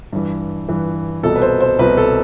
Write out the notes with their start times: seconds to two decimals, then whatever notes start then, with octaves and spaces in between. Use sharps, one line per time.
0.13 G2 E3
0.69 G2 E3
1.23 C2 B2 A4
1.35 B4
1.42 C5
1.61 C5
1.79 C2 B2 B4
1.97 A4